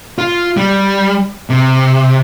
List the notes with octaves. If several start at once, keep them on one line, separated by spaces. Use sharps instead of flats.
F4
G3
C3